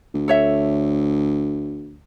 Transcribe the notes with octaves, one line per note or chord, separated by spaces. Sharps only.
D2
A4 C#5 E5